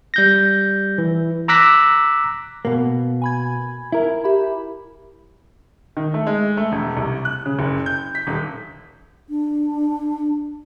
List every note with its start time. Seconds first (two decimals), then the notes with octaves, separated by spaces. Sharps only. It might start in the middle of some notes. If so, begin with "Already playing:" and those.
0.14 G3 G6 A#6
0.98 E3
1.48 A#5 D6 E6 F#6 A#6 B6
2.65 B2 A#3
3.22 G#5 B5 G#6
3.92 E4 A#4
4.24 G4 E5 B5
5.97 D#3
6.14 A3
6.27 G#3
6.57 A3
6.72 E1
6.97 C2
7.25 F#6
7.46 C#3
7.59 F#1
7.86 G6
8.15 B6
8.27 D#1
9.30 D4